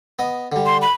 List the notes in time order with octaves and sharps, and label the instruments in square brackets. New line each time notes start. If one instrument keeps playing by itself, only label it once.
[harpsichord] B3 D#5
D3 G3
[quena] C6
B5